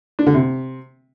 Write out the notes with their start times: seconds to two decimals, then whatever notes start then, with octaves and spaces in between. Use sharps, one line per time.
0.19 D4
0.26 D3
0.34 C3